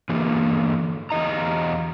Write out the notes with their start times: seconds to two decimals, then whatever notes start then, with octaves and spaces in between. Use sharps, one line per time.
0.10 D3 E3 A#3
1.11 E2 D#5 A#5